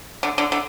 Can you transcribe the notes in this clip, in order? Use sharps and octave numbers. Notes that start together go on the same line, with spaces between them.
D3
D3
D3